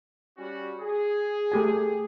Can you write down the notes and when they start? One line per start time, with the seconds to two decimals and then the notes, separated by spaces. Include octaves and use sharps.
0.38 G3 C#4 F#4
0.80 G#4
1.52 A3 G4 G#5